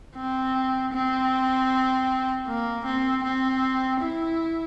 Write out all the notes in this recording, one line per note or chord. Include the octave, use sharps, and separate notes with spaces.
C4
C4
A#3
C4
C4
E4